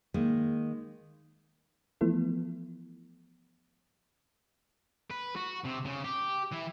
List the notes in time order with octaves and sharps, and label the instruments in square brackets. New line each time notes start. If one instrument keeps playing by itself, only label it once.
[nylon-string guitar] D#3 G#3 A#3
[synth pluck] E3 F3 A3 B3 E4 A4
[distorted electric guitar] B4
F#4
C3
C#3
G4
E3